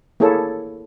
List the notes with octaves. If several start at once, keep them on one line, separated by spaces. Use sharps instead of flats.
A#3 E4 G#4 A4 C#5